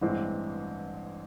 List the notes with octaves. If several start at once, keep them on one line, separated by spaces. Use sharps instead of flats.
A1 G2 E3 G#3 C4